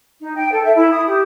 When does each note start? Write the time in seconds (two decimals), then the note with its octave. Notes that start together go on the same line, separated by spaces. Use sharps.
0.21 D#4
0.36 G5
0.51 A4
0.63 E5
0.75 E4
0.91 D#6
1.06 G4